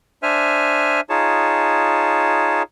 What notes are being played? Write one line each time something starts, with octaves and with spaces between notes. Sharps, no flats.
D4 C5 E5 G#5 F6
D#4 F4 G#4 C#5 A5